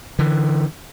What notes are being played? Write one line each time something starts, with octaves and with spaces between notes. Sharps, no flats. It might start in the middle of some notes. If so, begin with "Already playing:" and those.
D3 E3